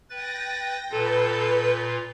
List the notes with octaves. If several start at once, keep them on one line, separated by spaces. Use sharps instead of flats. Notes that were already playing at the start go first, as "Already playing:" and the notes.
B4 G5 A6 A#6
A#2 F4 A4 B4 G6